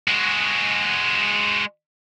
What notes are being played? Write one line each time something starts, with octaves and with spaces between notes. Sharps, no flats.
G#3 F#4